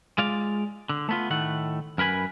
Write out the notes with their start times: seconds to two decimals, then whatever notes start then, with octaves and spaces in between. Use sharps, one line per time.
0.18 G#3 F4 D5 F5
0.89 D3
1.09 A3 B3 F4
1.30 A2 D#3 A3 F#5
1.98 F#2 A#4 B4 G#5 B5